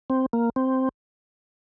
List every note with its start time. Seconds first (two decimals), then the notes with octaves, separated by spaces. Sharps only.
0.10 C4
0.33 A#3
0.56 C4